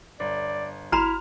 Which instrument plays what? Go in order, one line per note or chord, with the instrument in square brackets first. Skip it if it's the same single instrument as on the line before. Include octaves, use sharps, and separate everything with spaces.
[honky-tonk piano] G1 [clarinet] D5
[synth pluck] G#1 [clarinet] E4 [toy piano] F#4 A#5 [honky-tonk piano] F6 F7